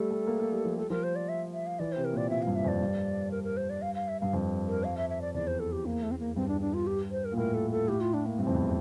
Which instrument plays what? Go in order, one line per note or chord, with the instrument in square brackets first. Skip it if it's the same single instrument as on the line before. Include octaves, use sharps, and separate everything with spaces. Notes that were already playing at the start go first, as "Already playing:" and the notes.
Already playing: [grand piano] G3 A3 [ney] A4
[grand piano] A3
A#3
A#3
G3
F3
[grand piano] G3 [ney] A4
[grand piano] F3 [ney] A#4
[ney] C5
D5
E5
E5
F5
[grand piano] E3 [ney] D5
[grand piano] C3 [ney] C5
[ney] A#4
[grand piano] A#2 [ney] D5
[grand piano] A#2 [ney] E5
[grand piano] G2 [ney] F5
[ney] E5
[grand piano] F2 [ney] D5
[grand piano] G2
[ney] A#4
A#4
C5
D5
F5
F5
E5
[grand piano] G2 [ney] F5
[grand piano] F2
[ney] A#4
F5
E5
E5
D5
[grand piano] E2 [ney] D5
[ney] C5
A4
G4
A#3
A3
C4
A#3
[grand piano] G2 [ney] C4
[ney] D4
D4
F4
G4
C5
A#4
[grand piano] A#2
[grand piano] A2 [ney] A#4
[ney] A4
A4
[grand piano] A2 [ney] G4
[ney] F4
D4
A#3
[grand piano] G2 [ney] C4
[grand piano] F2
E2